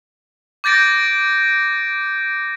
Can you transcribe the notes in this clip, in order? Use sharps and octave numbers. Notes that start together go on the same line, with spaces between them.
D6 G6 A6 A#6 D7